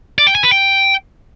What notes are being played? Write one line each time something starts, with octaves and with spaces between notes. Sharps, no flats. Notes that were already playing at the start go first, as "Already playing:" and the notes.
D5
G5
G#5
B4
G5